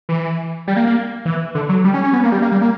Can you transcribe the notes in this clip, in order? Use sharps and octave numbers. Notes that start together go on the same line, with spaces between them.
E3
G3
A#3
A#3
E3
D3
F#3
G3
C#4
C#4
B3
A#3
G3
A#3
G3
A#3